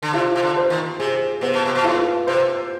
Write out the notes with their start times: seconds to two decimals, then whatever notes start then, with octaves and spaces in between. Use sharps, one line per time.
0.03 D3
0.13 C3 F4
0.36 C3
0.42 D3
0.57 C5
0.70 D#3
0.99 C3 G#4
1.41 C3 B3
1.54 B2
1.65 C3
1.75 B2
1.84 G#2 F4
2.27 C3 C5